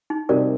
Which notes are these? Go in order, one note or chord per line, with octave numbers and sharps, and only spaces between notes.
D#4
C3 G3 C4 D#4 G4 A#4 D5